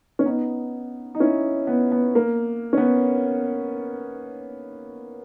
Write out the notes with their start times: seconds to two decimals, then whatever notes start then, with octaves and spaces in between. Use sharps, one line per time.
0.19 C#4
0.26 B3 D#4
1.15 D#4
1.20 C#4 E4
1.67 B3
1.92 B3
2.15 A#3
2.73 C#4
2.77 B3